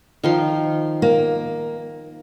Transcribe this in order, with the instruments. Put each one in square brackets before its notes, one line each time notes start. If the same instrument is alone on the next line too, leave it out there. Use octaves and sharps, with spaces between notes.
[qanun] D#3 F3 C6
[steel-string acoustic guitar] A#3